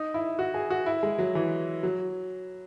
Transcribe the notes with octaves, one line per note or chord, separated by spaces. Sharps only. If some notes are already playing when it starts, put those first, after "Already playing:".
Already playing: D#4
E4
F#4
G#4
F#4
E4
G#3
F#3
E3
F#3